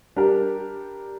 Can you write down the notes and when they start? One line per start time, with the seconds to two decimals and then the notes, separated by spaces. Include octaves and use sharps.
0.16 G3 D4 G4 A#4